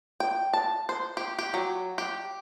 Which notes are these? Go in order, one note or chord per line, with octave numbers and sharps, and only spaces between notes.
G5
A5
C5
G4
G4
F#3
G4